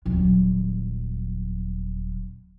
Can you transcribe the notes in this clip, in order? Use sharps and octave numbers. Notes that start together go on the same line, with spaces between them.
D#1 F#3